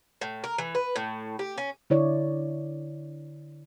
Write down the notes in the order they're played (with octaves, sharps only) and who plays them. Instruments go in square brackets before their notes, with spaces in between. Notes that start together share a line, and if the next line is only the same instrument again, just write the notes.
[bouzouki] A2
A#4
E3
B4
A2
G4
C#4
[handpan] D3 E4 C#5 D5